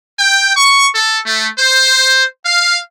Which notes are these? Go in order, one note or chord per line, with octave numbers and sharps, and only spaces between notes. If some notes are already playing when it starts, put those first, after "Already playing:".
G5
C#6
A4
A3
C5
F5